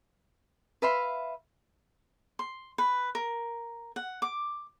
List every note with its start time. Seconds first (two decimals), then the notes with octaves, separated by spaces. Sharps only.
0.82 B4 E5 F5 C6
2.39 C6
2.78 B4
3.15 A#4
3.96 F#5
4.22 D6